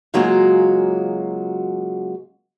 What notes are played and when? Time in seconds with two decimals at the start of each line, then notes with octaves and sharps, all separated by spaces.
0.14 C#3 F#3 G#3 A#3 F4 F#4